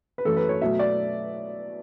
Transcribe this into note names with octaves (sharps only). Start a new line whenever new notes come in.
B4
F#2 E3 A3 A4
B4
C#5
B2 F#3 A3 E5
D5